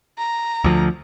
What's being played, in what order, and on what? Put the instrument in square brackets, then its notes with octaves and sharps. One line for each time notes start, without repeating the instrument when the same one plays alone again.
[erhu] A#5
[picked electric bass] D2 F3